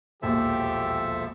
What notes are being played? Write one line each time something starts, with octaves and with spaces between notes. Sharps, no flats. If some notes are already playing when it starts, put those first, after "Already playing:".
E1 A#1 D#2 F3 G4 A4 E5